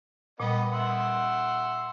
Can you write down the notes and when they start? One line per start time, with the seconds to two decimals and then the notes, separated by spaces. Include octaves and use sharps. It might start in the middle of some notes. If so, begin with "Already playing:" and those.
0.40 A#2 G3 B3 D#5
0.72 E5 F#5 C6